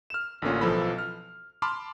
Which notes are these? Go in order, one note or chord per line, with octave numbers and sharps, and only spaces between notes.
F6 E7
A1 D3 A#3 C#4 F4
B1 E3 F3 A4 B5
F6
A5 B5 C6 D6 F6